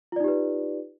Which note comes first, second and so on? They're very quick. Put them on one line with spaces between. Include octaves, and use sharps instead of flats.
F4 D5 D#4 G4 B4